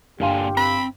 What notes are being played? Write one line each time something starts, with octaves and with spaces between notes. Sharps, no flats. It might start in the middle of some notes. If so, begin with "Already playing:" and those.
G1 A#2 D3 G4 F5 G#5 C6
C4 B5